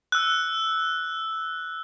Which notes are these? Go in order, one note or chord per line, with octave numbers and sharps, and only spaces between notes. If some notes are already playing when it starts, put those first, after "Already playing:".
E6 F#6